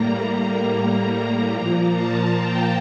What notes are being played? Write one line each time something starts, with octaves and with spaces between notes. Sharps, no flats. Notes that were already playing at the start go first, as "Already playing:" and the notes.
Already playing: A2 G3 A#3 A#5
A#2 F3 A#3 A#5
A5
G5